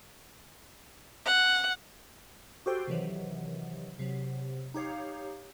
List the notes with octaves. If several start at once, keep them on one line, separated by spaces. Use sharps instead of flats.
F#5
F#4 G4 A4 C5 G5
C3 D#3 E3 F#3
C3 F#3
D#4 G4 C#5 F5